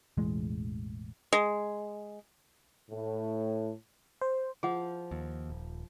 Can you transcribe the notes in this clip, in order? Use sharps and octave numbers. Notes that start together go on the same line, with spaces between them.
E1 A1 E3 G#3
G#3
A2
C5
F3 G#4 F#5
D#2
D#1